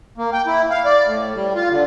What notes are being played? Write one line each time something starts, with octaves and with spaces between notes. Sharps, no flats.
A#3
G5
E4
F5
D5
A2
G3
F4
D3